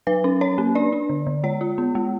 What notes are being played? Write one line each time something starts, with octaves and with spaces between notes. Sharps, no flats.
F#3 B4
C#4
C#4 C#5
A#3
D4 D5
D4
D3
D3
G#3 C#5
F4
B3
G#3